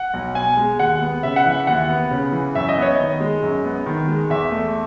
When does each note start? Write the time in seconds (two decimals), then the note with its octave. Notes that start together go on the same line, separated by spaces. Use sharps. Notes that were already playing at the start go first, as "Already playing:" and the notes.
Already playing: F#5
0.13 B1
0.35 B2 G#5
0.57 G#3
0.79 D#2 F#5
1.01 B3
1.23 C#3 E5
1.36 F#5
1.45 E3 E5
1.67 D#2 F#5
1.89 B3
2.11 C#3
2.32 E3
2.55 F#2 E5
2.69 D#5
2.77 B3
2.82 C#5
2.95 D#3 D#5
3.20 G#3
3.43 F#2
3.64 B3
3.86 D#3
4.08 G#3
4.30 E2 E5
4.52 A3